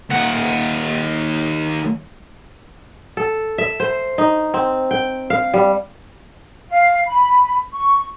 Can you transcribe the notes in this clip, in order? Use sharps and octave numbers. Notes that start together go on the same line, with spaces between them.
D#2 F#5
A4
E5
C5
D#4
C4
G5
F5
G3
F5
B5
C#6